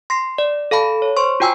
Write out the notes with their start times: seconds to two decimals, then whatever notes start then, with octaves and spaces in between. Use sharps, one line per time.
0.10 C6 A#6 C7
0.38 D5
0.71 A4 F5 A5 B5
1.02 C#5
1.17 C5 C6 C#6
1.40 F4 F#4 G5 G#5 E6